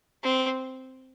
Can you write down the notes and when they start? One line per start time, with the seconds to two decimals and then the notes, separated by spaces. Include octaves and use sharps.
0.24 C4